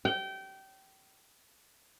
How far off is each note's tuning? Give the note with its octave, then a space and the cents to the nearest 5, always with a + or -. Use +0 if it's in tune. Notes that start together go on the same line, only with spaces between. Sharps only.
G5 -25